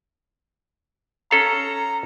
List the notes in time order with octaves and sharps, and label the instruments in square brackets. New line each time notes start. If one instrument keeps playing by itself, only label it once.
[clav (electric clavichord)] C#4 A4 F5 [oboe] A#5